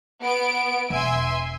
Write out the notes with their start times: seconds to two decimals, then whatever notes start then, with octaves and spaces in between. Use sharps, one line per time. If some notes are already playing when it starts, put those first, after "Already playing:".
0.22 B3 D7
0.90 E1 E5 G#5 C6